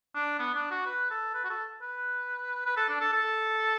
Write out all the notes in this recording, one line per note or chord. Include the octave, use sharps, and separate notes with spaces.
D4
B3
D4
F#4
B4
A4
B4
F#4
A4
B4
B4
A4
D4
A4
A4